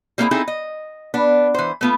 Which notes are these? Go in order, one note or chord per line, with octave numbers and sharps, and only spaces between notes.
G3 A#3 C4 C#4 E4 G#4
C4 D#4 E4 G#4 A4
D#5
B3 D4
E3 C5
A3 B3 F4